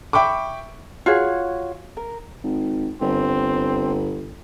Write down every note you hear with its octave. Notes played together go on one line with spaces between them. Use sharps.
E5 G5 B5 C#6 D6
F4 F#4 G#4 C#5
A#4
G#1
G1 C4